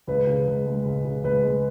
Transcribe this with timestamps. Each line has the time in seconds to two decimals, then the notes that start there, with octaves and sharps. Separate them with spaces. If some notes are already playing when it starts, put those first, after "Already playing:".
0.07 C#2 B4
0.27 C#3
0.47 C#2
0.66 G#3
0.85 C#2
1.05 C#3
1.24 C#2 B4
1.43 G#3